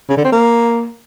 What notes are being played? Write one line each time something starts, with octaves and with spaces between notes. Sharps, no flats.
C#3
D3
C4
A#3